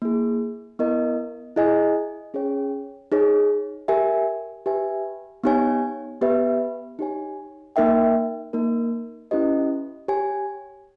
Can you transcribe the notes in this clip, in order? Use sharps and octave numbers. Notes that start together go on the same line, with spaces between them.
A#3 E4 G#4
B3 E4 A#4 D#5
E4 G#4 D#5 G#5
C#4 G#4 C#5 G5
D#4 G#4 C#5
G4 A#4 E5 G#5
G4 B4 E5 G#5
B3 D#4 G4 C#5 G#5
B3 G4 B4 E5
D#4 G4 C#5 G#5
A#3 D#4 A#4 E5 G5
A#3 D#4 A#4
C#4 E4 G4 B4 D#5
G4 C#5 G#5